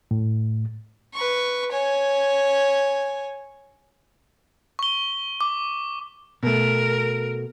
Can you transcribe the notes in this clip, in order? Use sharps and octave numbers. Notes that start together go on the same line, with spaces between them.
A2
B4 C#6
C#5 G#5
C#6 G7
D6
B2 A3 A#4